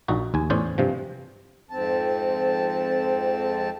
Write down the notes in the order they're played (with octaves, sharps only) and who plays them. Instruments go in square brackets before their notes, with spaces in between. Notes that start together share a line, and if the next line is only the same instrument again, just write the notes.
[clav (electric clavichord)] A#1 A#2 D#4 F#4
D#2 G#5
E2 A2 C#4 C5 D5 G#5
G2 C3 F3
[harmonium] F2 G#2 C4 A5